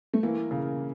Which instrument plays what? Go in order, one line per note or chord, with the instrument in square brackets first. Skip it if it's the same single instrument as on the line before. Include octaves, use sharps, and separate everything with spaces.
[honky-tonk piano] A3
[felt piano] E3 [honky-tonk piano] A#3
[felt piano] C#3